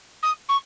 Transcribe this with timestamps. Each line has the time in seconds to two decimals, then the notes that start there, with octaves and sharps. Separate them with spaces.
0.23 D#6
0.49 C#6